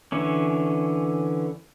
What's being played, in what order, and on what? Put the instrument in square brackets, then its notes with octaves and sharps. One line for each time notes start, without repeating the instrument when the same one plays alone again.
[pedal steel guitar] D3 E3 C#4